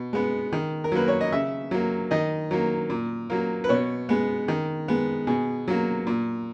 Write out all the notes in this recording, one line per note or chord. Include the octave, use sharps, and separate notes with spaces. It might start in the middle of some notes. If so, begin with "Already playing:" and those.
Already playing: B2
G#3 B3
D#3
A#4
F#3 A#3 B4
C#5
D#5
C#3 E5
F#3 A#3
D#3 D#5
F#3 A#3
A#2
F#3 A#3
B4
B2 C#5
G#3 B3
D#3
G#3 B3
B2 G#4
F#3 A#3
A#2